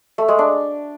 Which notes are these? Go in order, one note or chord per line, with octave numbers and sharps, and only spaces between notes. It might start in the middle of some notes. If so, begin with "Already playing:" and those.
A3
G#3
D4